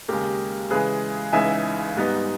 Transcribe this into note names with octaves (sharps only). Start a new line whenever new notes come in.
D#2 C#3 G#3 G4 A#4
C#3 E3 G#3 G#4 B4
C#2 C#3 E3 G#3 D#4 E5 G#5
G#2 G3 B3 D#4